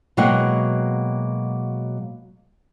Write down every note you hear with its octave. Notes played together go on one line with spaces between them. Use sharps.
B2 F#3 G#3 A#3 F#5 G5